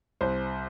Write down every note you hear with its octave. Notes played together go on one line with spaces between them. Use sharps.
C2 C5